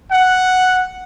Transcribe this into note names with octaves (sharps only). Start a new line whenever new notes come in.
F#5